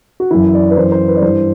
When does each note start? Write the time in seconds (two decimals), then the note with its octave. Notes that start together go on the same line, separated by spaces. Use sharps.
0.20 F#4
0.31 F#2 E3 E4
0.54 D5
0.70 B4
0.77 F#2 E3 C5
0.92 C5
1.08 B4
1.16 D5
1.22 G2 E3 C5